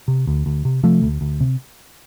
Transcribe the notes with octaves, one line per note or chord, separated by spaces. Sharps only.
C3
D2
D2
C3
C3 F3 A3
D2
D2
C3